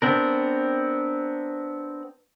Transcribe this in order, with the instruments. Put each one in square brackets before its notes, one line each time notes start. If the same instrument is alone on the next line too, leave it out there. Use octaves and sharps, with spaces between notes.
[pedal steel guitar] B3 C4 D4 A#4